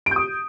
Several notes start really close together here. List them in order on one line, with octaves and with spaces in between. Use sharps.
D7 G6 D#6